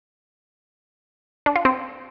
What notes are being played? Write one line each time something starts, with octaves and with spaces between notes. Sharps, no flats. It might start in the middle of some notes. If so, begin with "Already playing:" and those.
D4
F4
C4